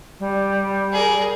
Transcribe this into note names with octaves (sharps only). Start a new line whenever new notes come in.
G3
G#4 A#4